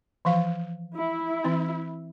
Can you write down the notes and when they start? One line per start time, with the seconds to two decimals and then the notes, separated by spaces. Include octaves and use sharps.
0.25 E3 F3 F5
0.96 E4
1.44 E3 C4